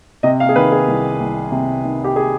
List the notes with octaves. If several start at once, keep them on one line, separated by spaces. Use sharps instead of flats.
C3 D#5
F5
G#4
D#3 B4
G#4
C2
C2
C3
D#3
G4
G#4